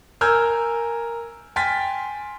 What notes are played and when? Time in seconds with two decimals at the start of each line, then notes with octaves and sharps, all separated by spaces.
0.21 A#4 G#5 E6 F6 G6 G#6
1.56 G5 G#5 C6 F6 A6 B6